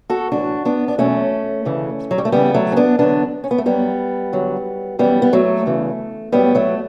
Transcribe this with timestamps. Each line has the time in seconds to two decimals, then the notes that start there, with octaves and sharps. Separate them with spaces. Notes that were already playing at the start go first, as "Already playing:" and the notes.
0.10 F#4 A4
0.32 A2 E3 D4 F#4
0.65 B3 D4
0.88 D4
0.98 E2 B2 F#3 A3 C#4
1.65 D2 C#3 E3
2.11 F#3
2.18 G3
2.25 A3
2.32 E2 C#3 E3 G3 B3
2.54 F#3 A3
2.72 C#4
2.77 B3 D4
2.99 E2 D3 F#3 B3 D4
3.44 C#4
3.51 B3
3.58 A3
3.66 G2 F#3 G3 B3
4.32 E2 D3 F#3
4.99 F#2 E3 G3 B3
5.22 B3
5.33 F#3 A3
5.66 E2 C#3 E3
6.32 A2 F#3 G3 B3
6.55 F#3 A3